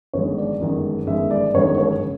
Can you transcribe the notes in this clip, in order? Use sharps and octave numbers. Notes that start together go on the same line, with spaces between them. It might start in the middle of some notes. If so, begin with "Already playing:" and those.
G1 F#2 D#3 G#3 C#5
D5
G1 F#2 D#3 G#3
G1 F#2 D#3 G#3 E5
D5
G1 F#2 D#3 G#3 C#5
C#5
C#3